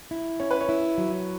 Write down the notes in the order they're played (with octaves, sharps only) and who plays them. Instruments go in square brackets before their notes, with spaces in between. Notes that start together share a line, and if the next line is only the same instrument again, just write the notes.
[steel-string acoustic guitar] E4
[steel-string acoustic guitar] C#4 [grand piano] C#5
[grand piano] B4
C#5
[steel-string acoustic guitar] E4
F#3